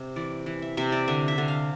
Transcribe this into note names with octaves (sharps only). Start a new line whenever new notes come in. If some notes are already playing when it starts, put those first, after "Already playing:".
Already playing: C3
E3 D5
E3
E5
C3 E5
D5
D3 E5
E5
D3
F5